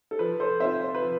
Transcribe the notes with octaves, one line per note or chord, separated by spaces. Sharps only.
A4
F3 B4
A4 C5
C4 F4 C5 E5
C5
B4
F3